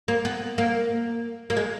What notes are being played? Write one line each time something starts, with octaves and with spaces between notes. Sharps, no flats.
A#3
B3
A#3
A#3
G#3